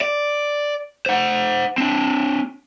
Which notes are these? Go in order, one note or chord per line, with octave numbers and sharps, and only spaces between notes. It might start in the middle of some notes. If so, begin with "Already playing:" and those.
D5
C5 F#5
C4 D4